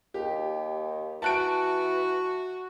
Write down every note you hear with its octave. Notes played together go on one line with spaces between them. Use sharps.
D#2 G4
E3 F#4 A5 F#6 D7